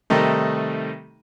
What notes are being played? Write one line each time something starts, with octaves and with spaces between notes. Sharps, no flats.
C3 D#3 G3 A3 D#4